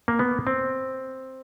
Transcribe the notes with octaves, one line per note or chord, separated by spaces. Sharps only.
A#3
B3
C4